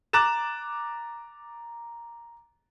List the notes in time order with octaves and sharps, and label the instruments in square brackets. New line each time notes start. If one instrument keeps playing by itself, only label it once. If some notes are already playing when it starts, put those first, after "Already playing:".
[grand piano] A#5 D6 F#6 A6 E7